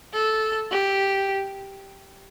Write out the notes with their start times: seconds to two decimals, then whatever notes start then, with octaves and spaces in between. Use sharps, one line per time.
0.13 A4
0.71 G4